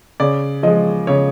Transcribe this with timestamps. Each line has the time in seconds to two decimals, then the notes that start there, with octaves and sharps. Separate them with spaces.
0.20 C#3 D5
0.63 F3 G#3 D#5
1.07 C#3 C#5